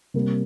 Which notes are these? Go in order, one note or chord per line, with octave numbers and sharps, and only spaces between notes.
C3 G3 A#3